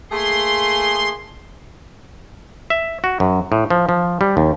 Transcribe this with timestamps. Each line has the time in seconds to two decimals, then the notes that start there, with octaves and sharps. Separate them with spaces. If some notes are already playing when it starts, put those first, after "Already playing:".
0.12 A3 A#3 G#4 C6
2.70 E5
3.04 F#4
3.20 F#2
3.52 A2
3.70 F3
3.89 F3
4.21 G3
4.37 D#2